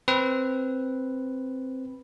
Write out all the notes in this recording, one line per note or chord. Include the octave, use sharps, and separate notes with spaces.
C4 B4